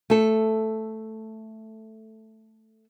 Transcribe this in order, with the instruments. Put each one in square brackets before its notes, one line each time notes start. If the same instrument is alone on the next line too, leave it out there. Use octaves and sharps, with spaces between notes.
[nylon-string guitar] A3 A4